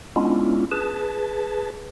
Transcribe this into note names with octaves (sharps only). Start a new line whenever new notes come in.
G#3 B3 C#4 D4 E4 F4
G#4 B4 A5